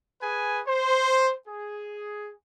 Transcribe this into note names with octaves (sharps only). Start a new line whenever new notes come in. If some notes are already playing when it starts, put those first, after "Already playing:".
G#4 B4 G#5
C5
G#4